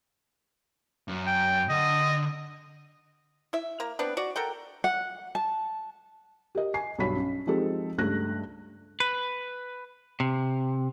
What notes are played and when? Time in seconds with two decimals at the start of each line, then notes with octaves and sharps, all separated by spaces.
1.08 F#2
1.27 G5
1.69 D3 D#5 F#5
3.53 E4 E5
3.80 A#3 A#4 A#5
3.99 B3 C4 D4 B4
4.17 F#4 D5
4.36 A4 A#4 F#5 G5
4.84 F#5
5.35 A5
6.55 G4 A#4 D#5
6.74 G#5 C7
6.98 B1 G2 C#5 B5 B6
7.16 C#4
7.47 F3 G#3 C4 D#4 G4 A4
7.98 C#2 G2 A3 F#6 A#6
9.00 B4
10.20 C3